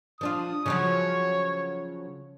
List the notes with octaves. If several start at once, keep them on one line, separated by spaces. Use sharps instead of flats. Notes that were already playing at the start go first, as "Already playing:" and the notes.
F3 D4 F4 D#6
C#3 F3 F#3 C#5